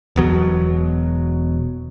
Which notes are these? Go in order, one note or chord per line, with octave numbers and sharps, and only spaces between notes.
E1 B2 F#3